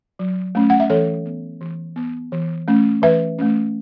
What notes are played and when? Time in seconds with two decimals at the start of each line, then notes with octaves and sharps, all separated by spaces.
0.19 F#3
0.55 A3 C#4
0.70 F#5
0.80 E5
0.90 E3 A4 C#5
1.25 B3
1.61 E3
1.96 B3
2.32 E3
2.68 A3 C#4
3.02 E3 B4 E5
3.39 A3 C#4